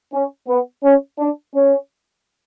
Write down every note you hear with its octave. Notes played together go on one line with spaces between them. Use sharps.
C#4
B3
C#4
D4
C#4